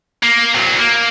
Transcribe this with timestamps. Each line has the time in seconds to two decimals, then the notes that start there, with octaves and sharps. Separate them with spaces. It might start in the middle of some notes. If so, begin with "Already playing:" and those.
0.23 A#3
0.54 C2 F#3
0.79 A#3